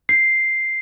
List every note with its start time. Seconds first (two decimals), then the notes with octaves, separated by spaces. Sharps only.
0.09 C7